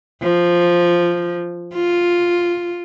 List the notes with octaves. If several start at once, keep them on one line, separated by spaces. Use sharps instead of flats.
F3
F4